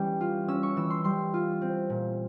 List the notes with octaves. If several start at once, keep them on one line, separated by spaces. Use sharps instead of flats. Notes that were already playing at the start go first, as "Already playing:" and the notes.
Already playing: E3 G3 C#4
F4
C#4 E6
C#6
E3 E6
C6
G3 C6
F4
C4
A#2